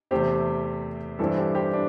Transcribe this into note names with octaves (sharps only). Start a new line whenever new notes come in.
E2 C3 A3 C4 G4 C5
G2 E3 G3 C4 E4 A4
G4 C5
G4 C5
D4